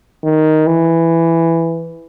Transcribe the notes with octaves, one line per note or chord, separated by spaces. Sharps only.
D#3
E3